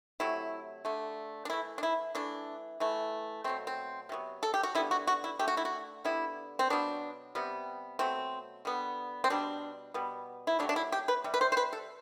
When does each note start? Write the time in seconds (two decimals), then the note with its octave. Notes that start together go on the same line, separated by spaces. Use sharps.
0.20 C3 F#3 A3 E4
0.85 D3 A3
1.45 D4
1.50 E3 A3 E4
1.78 D4
1.83 E4
2.15 E3 A3 D4
2.80 E3 A3
3.44 B2 F#3 A3 C4
3.67 C4
4.09 C3 F#3 B3
4.43 A4
4.54 G4
4.63 F#4
4.75 D3 G3 B3 E4
4.91 F#4
5.07 F#4
5.24 E4
5.39 D3 A3 G4
5.48 F#4
5.57 E4
5.65 F#4
6.04 D3 G3 B3 E4
6.59 C4
6.70 B2 F#3 B3 D4
7.35 C3 G3 B3
7.99 B2 F#3 A3 C4
8.65 D3 G3 B3
9.24 C4
9.30 B2 G3 B3 D4
9.94 B2 G3 B3
10.47 E4
10.59 C3 F#3 A3 D4
10.69 D4
10.76 E4
10.92 G4
11.08 B4
11.24 C3 G3
11.34 B4
11.41 C5
11.52 C5
11.57 B4
11.73 A4